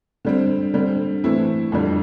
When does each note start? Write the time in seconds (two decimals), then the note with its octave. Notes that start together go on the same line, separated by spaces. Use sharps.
0.25 D3 G3 C4
0.74 D3 G3 C4
1.24 E3 A3 C4 E4
1.72 F2 D3 G3